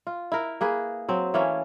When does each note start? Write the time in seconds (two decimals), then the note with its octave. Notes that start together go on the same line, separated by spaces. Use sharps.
0.07 F4
0.32 E4 A#4
0.61 A#3 G#4 B4
1.09 F#3 C4
1.34 E3 A3 A#3 C#4